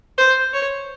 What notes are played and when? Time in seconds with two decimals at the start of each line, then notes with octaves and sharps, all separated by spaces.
0.18 C5
0.53 C#5